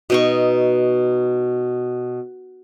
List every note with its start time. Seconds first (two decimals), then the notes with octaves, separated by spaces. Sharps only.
0.10 B2 D#4 C#6